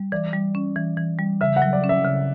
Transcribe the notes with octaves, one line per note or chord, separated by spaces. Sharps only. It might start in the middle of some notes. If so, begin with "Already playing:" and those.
Already playing: G3
E3 D5
G3
C#4
E3
E3
G3
C#3 E5
F#5
F#3
D5
C#4
E5
C#3